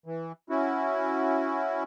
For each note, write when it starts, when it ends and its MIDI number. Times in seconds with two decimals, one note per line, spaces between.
0.06 0.32 52
0.50 1.84 61
0.50 1.84 64
0.50 1.84 66